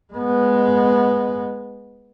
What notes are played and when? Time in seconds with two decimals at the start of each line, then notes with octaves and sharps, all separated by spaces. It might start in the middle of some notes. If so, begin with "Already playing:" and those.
0.13 G#3 B3